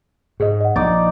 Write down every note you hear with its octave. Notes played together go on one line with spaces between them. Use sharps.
G#2 G#4 D#5
D#5 F#5
A#1 D#4 D5 A6